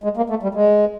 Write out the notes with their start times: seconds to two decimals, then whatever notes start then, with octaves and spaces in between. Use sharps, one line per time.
0.04 G#3
0.17 A#3
0.30 A3
0.43 G3
0.54 G#3